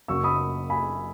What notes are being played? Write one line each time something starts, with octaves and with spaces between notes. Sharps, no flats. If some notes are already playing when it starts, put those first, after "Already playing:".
F#1 F#2 C#3 F#3 A#3 C#6 E6
B5 D#6
G#5 B5